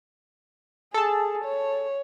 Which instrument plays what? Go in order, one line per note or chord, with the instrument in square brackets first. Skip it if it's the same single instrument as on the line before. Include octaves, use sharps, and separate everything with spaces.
[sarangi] G#4 [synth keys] A4 A5
[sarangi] C#5